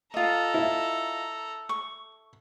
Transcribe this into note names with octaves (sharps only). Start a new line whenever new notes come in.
F4 A4 D#5 A#5
E4
C#6